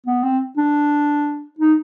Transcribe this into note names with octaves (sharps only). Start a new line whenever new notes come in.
B3
C4
D4
D#4